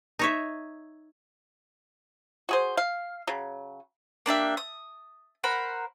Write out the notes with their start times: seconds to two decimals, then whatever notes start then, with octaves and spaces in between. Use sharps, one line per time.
0.19 D#4 C#5 E5
2.49 F#4 G#4 C5
2.77 F5
3.27 C#3 F#3
4.26 A#3 D4 G4 E5
4.57 D#6
5.44 A#4 C5 F#5 B5